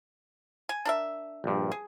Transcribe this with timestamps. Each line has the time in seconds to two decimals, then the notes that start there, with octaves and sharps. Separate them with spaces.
0.69 G#5
0.85 D4 A#4 E5
1.44 A#1 G2
1.72 G#4